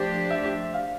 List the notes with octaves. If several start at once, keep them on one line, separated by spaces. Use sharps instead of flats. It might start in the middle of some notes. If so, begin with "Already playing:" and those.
Already playing: F3 A3 D4 G4 C5
E5
F5